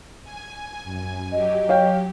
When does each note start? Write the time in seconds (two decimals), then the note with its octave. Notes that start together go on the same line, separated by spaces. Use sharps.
0.24 G#5
0.82 F#2 G#5
1.32 F#3 G4 D#5
1.69 C#5 F5 G5